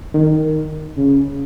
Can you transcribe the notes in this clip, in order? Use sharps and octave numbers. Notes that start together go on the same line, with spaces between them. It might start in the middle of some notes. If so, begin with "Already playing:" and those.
D#3
C#3